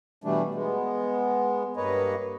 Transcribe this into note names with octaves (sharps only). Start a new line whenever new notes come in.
B2 E3 G3 A3 D4
G#3 B3
G2 A#3 B4 C#5 D#5